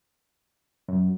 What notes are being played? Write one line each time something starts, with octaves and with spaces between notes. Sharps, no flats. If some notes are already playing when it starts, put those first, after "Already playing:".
F#2